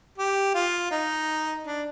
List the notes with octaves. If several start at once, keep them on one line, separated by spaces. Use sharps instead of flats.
G4
F4
D#4
D4